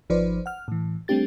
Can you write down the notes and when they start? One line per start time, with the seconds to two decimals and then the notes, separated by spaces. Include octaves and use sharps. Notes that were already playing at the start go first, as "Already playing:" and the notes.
0.10 G#1 F3 D#4 B4 C5 D5
0.46 F#5 F6
0.68 A2 E3
1.08 G3 A3 C4 D4 G4 A6